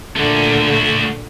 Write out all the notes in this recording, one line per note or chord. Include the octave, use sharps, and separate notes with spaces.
A#2 D3 A3 F#4